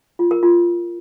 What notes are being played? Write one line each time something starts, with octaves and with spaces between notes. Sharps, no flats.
F4
A#4
F4